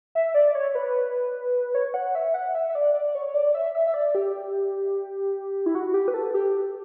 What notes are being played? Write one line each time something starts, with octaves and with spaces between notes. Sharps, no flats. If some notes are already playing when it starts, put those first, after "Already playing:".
E5
D5
C#5
B4
C#5
F#5
E5
F#5
E5
E5
D5
D5
C#5
D5
E5
E5
E5
D5
G4
E4
F#4
G4
B4
A4
G4